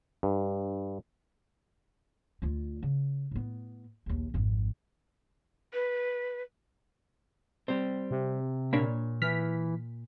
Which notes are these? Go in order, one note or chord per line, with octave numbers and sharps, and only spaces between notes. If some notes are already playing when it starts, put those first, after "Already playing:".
G2
D2 F4
C#3
A2 B3
A#1 D#2
G#1 F2
B4
G3 C4
C3
A#2 A#3 D4 C#5 B5
E3 F6 B6